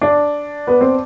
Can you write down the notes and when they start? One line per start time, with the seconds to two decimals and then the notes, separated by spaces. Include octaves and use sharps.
0.01 D4
0.67 B3
0.81 C4